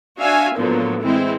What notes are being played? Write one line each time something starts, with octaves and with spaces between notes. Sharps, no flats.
D4 F#4 E5 F5 G#5
A2 D3 F3 F#3 A#3 B3
E3 G#3 C4 E4